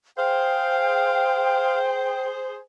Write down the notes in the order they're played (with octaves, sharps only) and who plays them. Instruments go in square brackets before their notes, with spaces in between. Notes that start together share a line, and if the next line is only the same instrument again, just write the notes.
[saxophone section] G#4 C5 [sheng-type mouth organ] F5 [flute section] G5